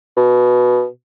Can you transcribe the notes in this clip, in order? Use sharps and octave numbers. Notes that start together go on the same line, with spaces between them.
B2